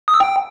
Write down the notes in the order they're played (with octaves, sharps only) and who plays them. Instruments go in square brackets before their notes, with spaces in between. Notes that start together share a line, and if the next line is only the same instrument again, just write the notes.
[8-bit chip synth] D#6
E6
G5